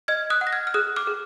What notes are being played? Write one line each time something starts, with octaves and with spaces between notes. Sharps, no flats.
D#5 F6 G#6
D#6 F#6
F#5
A#6
F6 G#6
F6
G#4 D#6 F#6
D6 F6
G#4